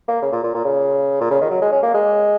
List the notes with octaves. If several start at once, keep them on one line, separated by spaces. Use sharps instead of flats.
A#3
C#3
A#2
A#2
A#2
C#3
A#2
C#3
D#3
F#3
G#3
C#4
A#3
G#3